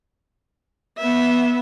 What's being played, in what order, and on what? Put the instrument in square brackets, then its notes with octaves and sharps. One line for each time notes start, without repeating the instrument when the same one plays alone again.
[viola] B3 E5